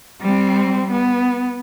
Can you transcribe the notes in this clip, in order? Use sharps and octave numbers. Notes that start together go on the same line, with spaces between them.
G3 C4
B3